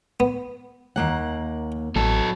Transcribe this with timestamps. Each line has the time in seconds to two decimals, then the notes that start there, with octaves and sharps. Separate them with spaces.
0.20 B3
0.96 D#2 A#3 F#5
1.96 A1 F#3 A4